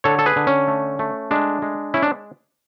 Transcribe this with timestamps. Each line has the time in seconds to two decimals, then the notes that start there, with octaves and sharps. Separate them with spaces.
0.04 D3 A4 C#5
0.19 A4
0.26 G#4 B4
0.36 D3
0.47 C#4
0.68 A3
0.99 A3
1.31 G#3 D4
1.62 G#3
1.94 C#4 E4
2.02 D4